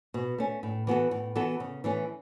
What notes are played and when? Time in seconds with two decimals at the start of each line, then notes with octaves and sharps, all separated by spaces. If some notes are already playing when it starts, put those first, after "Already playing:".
0.14 B2
0.38 A3 C#4
0.63 A2
0.87 E3 B3 F#4 A4
1.11 A2
1.35 E3 B3 F#4 A4
1.60 C#3
1.84 E3 A3 C#4